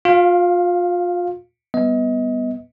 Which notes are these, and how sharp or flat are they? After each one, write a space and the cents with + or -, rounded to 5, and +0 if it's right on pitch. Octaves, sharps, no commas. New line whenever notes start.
F4 +30 F5 +0
G3 +0 B3 +0 D#5 +30